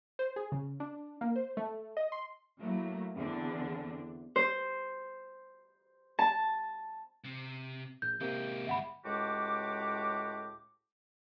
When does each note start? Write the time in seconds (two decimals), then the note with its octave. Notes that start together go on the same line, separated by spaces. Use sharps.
0.19 C5
0.36 G#4
0.52 C#3
0.80 D4
1.21 A#3
1.36 C5
1.57 A3
1.97 D#5
2.12 C6
2.59 F#3 A3 A#3 E4
3.16 E2 D3 C4 D4
4.36 C5
6.19 A5
7.24 C3
8.02 A#1 G6
8.20 C3 G#3 A#3 C4 G4
8.67 G1 E5 F#5 B5
9.05 C#2 A2 G#3 F#4 G4 D6